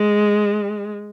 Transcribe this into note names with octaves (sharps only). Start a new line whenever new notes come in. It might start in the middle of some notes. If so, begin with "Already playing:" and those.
Already playing: G#3